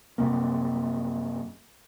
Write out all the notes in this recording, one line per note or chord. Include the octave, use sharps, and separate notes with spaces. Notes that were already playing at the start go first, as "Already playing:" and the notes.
F#2 C3 A#3